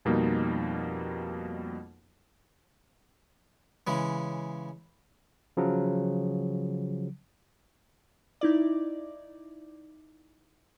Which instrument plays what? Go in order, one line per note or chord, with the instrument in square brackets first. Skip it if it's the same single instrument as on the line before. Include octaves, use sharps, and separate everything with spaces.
[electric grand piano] F2 B2 G3 A#3 D#4
[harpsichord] C#3 E3 G#3
[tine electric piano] C#3 F3 F#3
[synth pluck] D#4 E4 D5